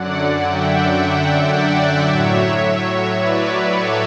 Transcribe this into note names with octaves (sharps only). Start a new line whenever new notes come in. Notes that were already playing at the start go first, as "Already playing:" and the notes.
Already playing: F#2 D3 F#3 D5 F#5
E5 G5
E5 G5
D5 F#5
A2 F#3 C#5 E5
C#5 E5
B4 D5
A4 C#5